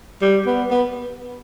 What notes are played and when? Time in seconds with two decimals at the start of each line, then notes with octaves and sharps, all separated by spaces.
0.21 G3
0.46 B3
0.70 B3